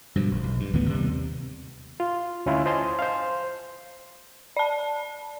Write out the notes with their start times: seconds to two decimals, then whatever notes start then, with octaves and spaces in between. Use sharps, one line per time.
0.16 G2 B2 F3
0.31 A#1
0.44 B1
0.60 G2
0.73 D#2 A2 E3 B3
0.88 D#2 C3 G3
2.00 F4
2.46 D2 C#4 E4 F4
2.66 C5 D#5 G#5 A5 C6
2.99 C5 F5
4.56 D5 A5